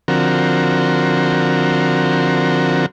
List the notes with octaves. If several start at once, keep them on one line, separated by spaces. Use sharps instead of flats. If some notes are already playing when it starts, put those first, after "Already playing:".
D3 F3 C4 F#4 A#4